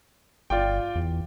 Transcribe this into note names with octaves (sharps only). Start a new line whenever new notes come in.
G1 F4 D5 G5
E2